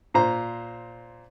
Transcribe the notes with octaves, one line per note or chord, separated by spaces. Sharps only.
A#2 C5 A#5